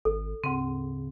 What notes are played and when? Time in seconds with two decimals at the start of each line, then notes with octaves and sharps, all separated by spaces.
0.05 G#1 A4
0.44 D2 G#2 C#3 C4